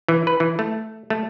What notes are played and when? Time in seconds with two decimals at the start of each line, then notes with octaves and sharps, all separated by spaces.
0.08 E3
0.27 B4
0.40 E3
0.59 A3
1.10 A3